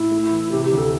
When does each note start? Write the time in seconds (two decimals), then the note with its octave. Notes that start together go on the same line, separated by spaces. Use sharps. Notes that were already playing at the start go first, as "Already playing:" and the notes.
Already playing: A2 E4
0.11 A3
0.31 E3
0.51 C3 G4
0.66 G4
0.72 D2
0.78 A4